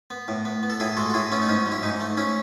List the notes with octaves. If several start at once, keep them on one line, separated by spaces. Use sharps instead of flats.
B3
A2
B3
B3
A4
A2 E4 G#4
G#3 F#4 A4
F#4
A2 E4 G#4
B3 C#4 E4
D#4
G#2 C#4
F#3
E4
G#2 D#4
A3
C#4 E4